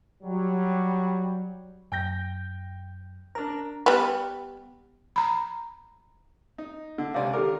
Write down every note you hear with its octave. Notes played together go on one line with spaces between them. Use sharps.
F#3 G3
F#2 G5 G6 A#6
D4 A#4 A#5
G3 B3
A#5 B5
D#4
D3
C#2 C3 D5 F5
D#3 G4 A4 A#4 D6